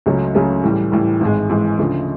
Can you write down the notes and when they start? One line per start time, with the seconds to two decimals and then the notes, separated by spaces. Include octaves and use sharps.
0.06 C#2 C#3 F#3 A3 C#4
0.35 C#2 C#3 F#3 A3 C#4
0.64 A2 E3 G3
0.92 A2 E3 G3
1.21 G#1 G#2 E3 G#3
1.49 G#1 G#2 E3 G#3
1.78 D2 C#3 F3 A3